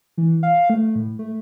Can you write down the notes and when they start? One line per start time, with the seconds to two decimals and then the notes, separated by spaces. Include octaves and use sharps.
0.17 E3
0.43 F5
0.70 A3
0.96 A2
1.19 A3